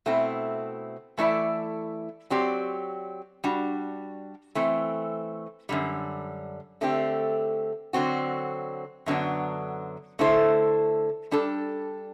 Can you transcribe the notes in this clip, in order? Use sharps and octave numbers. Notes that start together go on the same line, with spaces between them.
B2 A3 C4 E4
E3 A3 E4 A4 D5
F#3 C4 G4 D5
G3 D4 F#4
E3 A3 C4
F#2 D3 G3
D3 A3 C4 G4
D3 F#3 C4 F#4
F#2 D3 F#3 B3 D4
D3 A3 E4 A4 C5
G3 D4 A4